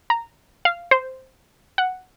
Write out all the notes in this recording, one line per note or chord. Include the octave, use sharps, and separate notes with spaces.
A#5
F5
C5
F#5